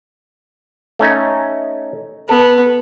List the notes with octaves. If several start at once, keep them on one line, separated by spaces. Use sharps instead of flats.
A3 C#4 D#4
B3 A4